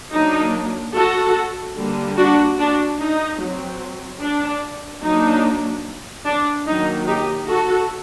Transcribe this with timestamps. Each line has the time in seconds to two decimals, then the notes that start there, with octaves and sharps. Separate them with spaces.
0.13 F#3 A#3 D4 D#4
0.95 F#4 A4
1.76 D3 G3 A#3
2.17 D4 F#4
2.58 D4 F#4
2.99 D#4
3.40 F#3 C4
4.21 D4
5.03 F#3 A#3 D4 D#4
6.25 D4
6.66 D#3 F#3 A#3 D#4
7.07 D#4 G4
7.48 F#4 A4